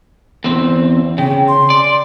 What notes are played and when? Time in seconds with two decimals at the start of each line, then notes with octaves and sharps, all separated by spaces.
0.44 E2 C4
1.18 C#3 G5
1.48 C6
1.70 D5